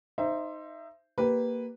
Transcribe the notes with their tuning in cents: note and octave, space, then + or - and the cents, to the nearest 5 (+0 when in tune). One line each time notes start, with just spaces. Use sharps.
D#4 +0 C5 +0 E5 +25
A#3 +0 G4 -5 B4 +0